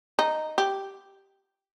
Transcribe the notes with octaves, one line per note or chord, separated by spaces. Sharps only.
D#4
G4